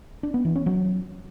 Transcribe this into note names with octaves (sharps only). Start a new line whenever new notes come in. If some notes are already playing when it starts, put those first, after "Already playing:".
D4
B3
E3
C#4
F#3